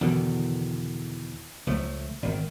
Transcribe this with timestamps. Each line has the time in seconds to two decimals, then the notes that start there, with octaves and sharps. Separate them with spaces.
0.01 E2 B2 D3 D#3
1.67 C#2 F3 A3
2.22 G#1 D#3